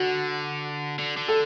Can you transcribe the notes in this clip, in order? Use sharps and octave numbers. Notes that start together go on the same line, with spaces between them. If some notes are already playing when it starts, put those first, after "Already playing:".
Already playing: D3 F#4
D3
D3
A4